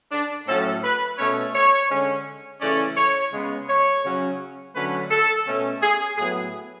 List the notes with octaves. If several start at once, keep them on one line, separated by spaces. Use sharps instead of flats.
D4
A2 F#3 C#4 A4
B4
B2 A3 C#4 C#5
C#5
D3 G#3 C#4
C#3 E3 A3 C#4 D5
C#5
C#3 G#3 B3
C#5
C#3 F#3 C#4
D3 F#3 A3 C#4 B4
A4
B2 A3 C#4
G#4
A2 F#3 B3 G#4